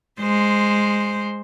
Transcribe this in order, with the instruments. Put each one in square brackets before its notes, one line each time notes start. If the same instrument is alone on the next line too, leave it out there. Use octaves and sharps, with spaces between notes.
[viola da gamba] G#3 C5